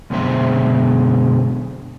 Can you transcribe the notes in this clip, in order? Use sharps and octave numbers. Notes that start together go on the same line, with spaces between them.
F#2 B2 D3 G#3 C5 E5